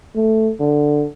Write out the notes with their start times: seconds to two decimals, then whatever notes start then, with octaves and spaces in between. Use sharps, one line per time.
0.16 A3
0.60 D3